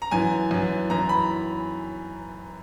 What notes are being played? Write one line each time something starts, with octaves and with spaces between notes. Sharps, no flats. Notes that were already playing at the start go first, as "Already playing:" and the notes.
A#5
F#2 E3 G#5
F#2 E3
F#2 E3 A#5
B5